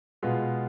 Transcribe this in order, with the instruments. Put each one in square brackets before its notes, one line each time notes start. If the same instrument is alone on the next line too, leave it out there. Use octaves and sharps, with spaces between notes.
[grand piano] B2 G#3 B3 F4